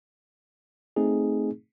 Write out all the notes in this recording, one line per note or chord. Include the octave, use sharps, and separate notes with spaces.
A3 C4 D#4 G#4